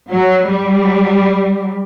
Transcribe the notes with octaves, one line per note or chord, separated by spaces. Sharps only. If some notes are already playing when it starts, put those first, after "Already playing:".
F#3
G3